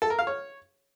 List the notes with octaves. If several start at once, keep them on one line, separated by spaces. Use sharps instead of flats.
A4
A#4
F5
C#5